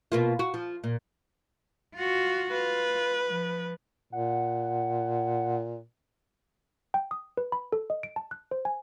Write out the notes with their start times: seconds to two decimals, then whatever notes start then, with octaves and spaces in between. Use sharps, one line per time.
0.12 B2 A#3 F4
0.39 F#4
0.54 F3
0.84 A#2
1.96 F4 F#4
2.51 F4 B4
3.26 F3
4.12 A#2 F#5
6.94 G5
7.11 D#6
7.37 B4
7.52 B5
7.72 A4
7.90 D#5
8.03 D7
8.16 A5
8.31 F#6
8.51 C5
8.65 G#5